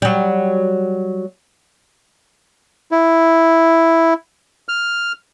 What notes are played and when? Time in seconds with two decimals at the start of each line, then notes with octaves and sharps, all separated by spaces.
0.02 F#3 G3
2.91 E4
4.69 F6